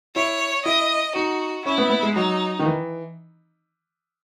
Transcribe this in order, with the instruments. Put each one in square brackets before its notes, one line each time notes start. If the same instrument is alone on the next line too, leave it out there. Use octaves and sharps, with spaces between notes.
[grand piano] E4 [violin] C#5
[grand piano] E4 [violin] D#5
[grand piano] D#4 [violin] F#4
[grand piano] C#4 [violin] E4
[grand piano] B3
B3
G#3
[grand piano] F#3 [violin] D#4
[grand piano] D#3
E3